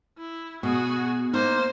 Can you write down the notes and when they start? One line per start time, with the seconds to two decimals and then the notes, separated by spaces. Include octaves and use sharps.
0.18 E4
0.63 B2 F#4 G#4
1.33 A#3 D#4 C5